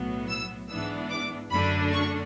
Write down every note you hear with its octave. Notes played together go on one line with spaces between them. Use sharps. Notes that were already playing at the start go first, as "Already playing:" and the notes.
Already playing: B1 A2 F#3 B3
E6
G#2 E3 B3 D4 E6
D6
F#2 D3 A3 D4 B5
C#6